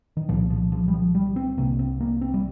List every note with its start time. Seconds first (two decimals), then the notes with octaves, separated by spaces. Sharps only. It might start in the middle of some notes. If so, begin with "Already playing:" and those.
0.17 D#3
0.29 C2 A#2 F3
0.50 F3
0.72 F3
0.88 G3
0.94 F3
1.15 G3
1.36 C4
1.57 C2 C3 A#3
1.79 C4
2.01 A#3
2.21 C4
2.34 G3